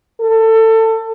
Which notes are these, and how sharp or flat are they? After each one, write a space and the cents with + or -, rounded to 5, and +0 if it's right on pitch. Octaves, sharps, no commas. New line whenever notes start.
A4 +25